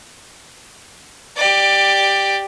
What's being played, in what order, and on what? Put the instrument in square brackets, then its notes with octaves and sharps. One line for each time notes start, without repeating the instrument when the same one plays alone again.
[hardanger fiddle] G4 D5